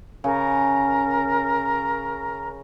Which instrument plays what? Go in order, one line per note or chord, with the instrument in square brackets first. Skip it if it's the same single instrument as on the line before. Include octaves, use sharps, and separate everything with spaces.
[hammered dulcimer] C#3 [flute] A#4